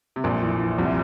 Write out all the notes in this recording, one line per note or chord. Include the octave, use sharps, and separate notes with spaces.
C3
A#1 F2 A#2
E3
E3
C2 C3 F3